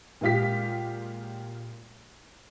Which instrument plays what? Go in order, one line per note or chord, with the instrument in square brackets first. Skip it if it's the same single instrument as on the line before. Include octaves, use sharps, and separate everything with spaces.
[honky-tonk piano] A#2 G#3 F4 G4 B6